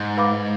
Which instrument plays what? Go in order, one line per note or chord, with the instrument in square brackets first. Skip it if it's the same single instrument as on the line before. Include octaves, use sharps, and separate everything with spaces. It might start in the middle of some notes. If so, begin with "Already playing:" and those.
Already playing: [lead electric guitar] G#2
[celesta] B4 F5 B5 D6